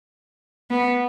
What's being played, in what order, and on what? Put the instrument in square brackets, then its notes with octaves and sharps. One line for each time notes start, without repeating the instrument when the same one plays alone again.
[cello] B3